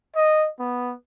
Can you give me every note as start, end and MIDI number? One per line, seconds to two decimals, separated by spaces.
0.16 0.47 75
0.59 0.94 59